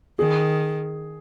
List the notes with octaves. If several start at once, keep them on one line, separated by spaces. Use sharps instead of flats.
D#3 G#4